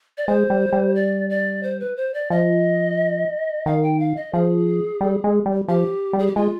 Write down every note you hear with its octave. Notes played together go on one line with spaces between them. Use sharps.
D5
G#3 C5
G3
G3
D5
D5
C5
B4
C5
D5
F3 D#5
D#3 F5
G5
F5
D#5
F3 G#4
G3
G#3
G3
F3 G4
G3
G#4
G4
G#3 F4